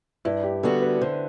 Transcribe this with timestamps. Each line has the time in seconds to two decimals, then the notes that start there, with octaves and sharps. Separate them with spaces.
0.25 G2 E4
0.43 G4
0.63 D3 G3 B3 F#4 A4
0.82 B4
1.01 D3 C5